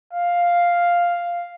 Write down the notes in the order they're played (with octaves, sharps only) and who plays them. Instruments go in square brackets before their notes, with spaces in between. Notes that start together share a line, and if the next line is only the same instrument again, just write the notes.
[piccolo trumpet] F5